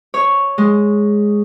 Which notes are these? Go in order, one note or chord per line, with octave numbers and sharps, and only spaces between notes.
C#5
G#3